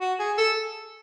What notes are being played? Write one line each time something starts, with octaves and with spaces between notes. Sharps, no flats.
F#4
G#4
A4